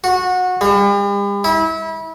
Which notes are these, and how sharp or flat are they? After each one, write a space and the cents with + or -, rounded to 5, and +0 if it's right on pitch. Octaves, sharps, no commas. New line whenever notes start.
F#4 -20
G3 +45
E4 -30